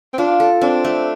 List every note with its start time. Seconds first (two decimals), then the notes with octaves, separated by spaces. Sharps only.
0.13 C4
0.18 D4 F4
0.40 A4
0.61 C4 D4
0.85 A3